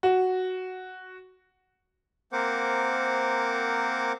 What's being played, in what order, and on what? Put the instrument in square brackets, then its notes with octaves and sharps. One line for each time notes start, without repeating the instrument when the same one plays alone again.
[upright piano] F#4
[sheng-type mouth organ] A#3 C4 A#4 C5 F#5 D6